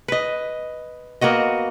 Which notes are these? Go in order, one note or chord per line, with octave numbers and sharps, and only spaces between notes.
B4 D#5
A#3 B3 F#4 D#5